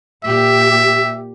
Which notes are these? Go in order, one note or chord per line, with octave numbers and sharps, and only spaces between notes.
A#2 G4 E5